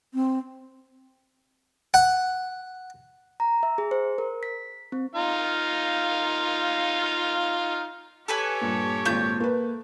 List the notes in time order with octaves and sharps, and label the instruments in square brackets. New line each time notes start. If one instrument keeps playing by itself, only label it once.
[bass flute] C4
[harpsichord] F#5
[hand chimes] A#5
E5
G#4
C5
A#4
B6
C4
[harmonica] D#4 F4 F5
[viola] G4 C#5 [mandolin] A4 B4 G#5
[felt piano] G2 A#2
[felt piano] G#1 A#2 F4 [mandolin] A3 G6
[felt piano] A#3 B4